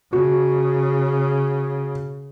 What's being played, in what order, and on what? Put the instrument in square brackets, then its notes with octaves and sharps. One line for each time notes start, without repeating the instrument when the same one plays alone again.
[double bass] C#3 [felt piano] F#4